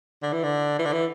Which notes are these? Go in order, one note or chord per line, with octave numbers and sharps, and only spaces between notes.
D3
E3
D3
E3
D3
E3